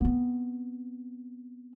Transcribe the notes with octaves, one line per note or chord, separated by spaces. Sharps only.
B3 C4